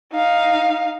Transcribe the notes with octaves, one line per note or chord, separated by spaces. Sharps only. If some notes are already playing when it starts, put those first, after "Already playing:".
D#4 F5